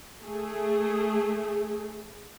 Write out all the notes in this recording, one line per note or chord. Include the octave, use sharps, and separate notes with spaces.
A3 G#4